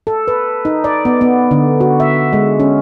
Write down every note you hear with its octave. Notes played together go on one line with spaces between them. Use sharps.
A4
B4
D#4
D5
B3
B3
D3
F#4
E5
G#3
C#4